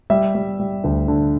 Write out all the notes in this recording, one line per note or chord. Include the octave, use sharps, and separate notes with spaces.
G3 E5
G3
G3
D2
D3